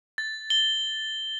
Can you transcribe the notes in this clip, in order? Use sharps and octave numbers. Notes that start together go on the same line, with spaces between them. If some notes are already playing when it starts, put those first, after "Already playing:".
A6
G7